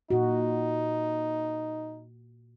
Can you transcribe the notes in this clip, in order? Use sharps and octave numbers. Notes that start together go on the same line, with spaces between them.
A#2 D#4 F#4